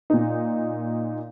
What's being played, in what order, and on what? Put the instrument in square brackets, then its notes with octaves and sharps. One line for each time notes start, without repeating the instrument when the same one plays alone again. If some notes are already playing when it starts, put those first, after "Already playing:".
[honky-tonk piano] A#2 D#4